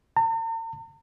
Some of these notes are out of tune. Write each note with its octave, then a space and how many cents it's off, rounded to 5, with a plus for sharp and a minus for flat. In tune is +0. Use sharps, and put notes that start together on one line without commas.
A#5 -45